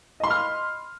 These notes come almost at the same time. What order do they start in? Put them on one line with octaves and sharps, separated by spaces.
D#5 C6 B5 F6